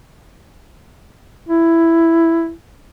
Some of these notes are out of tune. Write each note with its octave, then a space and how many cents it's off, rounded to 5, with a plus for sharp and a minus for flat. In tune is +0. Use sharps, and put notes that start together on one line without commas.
E4 +5